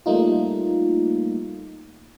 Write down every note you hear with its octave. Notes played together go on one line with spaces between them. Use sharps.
G3 A3 A#3 D#4 F4